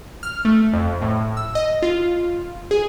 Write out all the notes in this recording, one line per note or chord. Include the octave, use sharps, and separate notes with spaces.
F6
A3
F2
A2
E6
D#5
F4
G#4